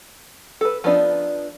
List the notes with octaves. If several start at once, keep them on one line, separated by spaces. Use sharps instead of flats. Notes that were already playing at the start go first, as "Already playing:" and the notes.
A4 B4
F3 B3 D4 D#4